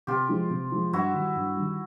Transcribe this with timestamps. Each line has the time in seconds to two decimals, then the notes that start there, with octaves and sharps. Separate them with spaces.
0.07 C3 F4 G4
0.29 F3 G#3
0.50 C3
0.72 F3 G#3
0.93 G2 E4 F#4
1.14 D#3 G3
1.36 G2
1.56 D#3 G3